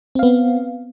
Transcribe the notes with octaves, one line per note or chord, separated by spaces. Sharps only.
B3 C4 F5